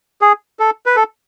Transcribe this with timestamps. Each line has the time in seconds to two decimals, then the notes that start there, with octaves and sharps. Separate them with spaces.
0.21 G#4
0.59 A4
0.86 B4
0.96 A4